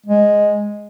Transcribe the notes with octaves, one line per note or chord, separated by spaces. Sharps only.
G#3